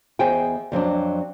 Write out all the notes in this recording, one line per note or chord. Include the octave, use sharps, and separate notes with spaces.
E2 G#4 C5 D#5 G5 G#5
F2 F#3 C4 D4